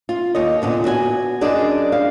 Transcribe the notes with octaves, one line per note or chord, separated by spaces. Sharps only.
F4
D#2 C#5 D#5
A#2 D3 B3
B3 F#4 D#5 G#5
F#2 D4 G#4 D5 D#5
F5